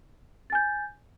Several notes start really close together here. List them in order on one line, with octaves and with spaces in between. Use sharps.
A6 G#5 G6